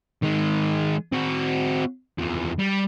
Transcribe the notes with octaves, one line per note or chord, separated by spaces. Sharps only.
D#3 G#3
C4 F#4
E2 F3
G3